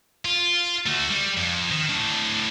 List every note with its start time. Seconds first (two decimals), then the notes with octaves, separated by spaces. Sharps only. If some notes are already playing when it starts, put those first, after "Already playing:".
0.25 F4
0.86 A3 F#4
1.09 G3
1.37 F2
1.71 D#3
1.89 A2 D4